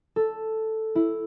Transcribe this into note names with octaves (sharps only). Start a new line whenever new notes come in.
A4
E4